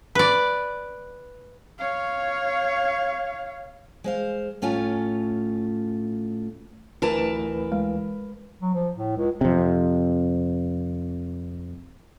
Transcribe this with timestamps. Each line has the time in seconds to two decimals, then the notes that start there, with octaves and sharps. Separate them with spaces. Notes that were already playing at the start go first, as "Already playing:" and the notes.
0.15 B4 D5
1.78 C#5 F5
4.04 G#3 C5 F5
4.62 A2 A3 C#4 F4 G#5
7.02 D2 E3 A#4 B4 A5
7.72 G#3
8.61 F#3
8.74 F3
8.97 A2
9.17 C#2
9.41 F2 C3